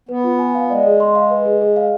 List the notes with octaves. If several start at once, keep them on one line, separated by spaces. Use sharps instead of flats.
B3 B4
F4
G#5
F5
G#3 D5
G#4
C6
F5
B4
G#4
G#4
F5